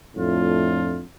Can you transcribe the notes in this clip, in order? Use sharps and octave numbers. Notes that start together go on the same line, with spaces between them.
F2 A2 A3 D4 F4